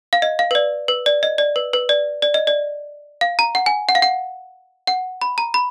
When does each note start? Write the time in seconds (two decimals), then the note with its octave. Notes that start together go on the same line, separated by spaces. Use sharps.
0.13 F5
0.22 D#5
0.39 F5
0.51 B4
0.55 D5
0.88 B4
1.06 D5
1.23 D#5
1.38 D5
1.56 B4
1.73 B4
1.89 D5
2.22 D5
2.34 D#5
2.47 D5
3.21 F5
3.39 A#5
3.55 F#5
3.66 G#5
3.89 F#5
3.95 F5
4.02 F#5
4.87 F#5
5.22 B5
5.38 A#5
5.54 B5